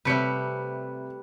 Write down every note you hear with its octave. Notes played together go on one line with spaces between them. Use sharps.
C3 G3 A3 B4 C#7